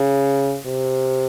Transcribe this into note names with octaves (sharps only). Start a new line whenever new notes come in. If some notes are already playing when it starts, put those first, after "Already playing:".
Already playing: C#3
C3